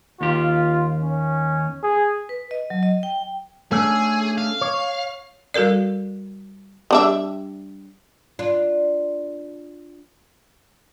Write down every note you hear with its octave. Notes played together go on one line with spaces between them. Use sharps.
D#2 F4 G4
C#4
G#4
B4
D#5
F#3
D#5
G5
A3 C#4 D4 G#4
F5
C#5
G3 F#4 A4 A#4 D5
G3 D4 E5
D4 F4